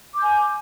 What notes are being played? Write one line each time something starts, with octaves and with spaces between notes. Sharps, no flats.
G#5 D6 G6